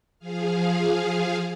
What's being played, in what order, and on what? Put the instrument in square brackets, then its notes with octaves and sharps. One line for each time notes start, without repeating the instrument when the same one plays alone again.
[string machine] F3 G#4 F5